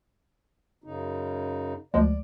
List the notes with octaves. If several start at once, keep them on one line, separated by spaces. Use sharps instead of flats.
F#2 C#3 D#4
D2 F3 G#3 D5